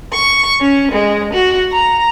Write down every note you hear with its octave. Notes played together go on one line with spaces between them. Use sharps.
C#6
C#4
G#3
F#4
A#5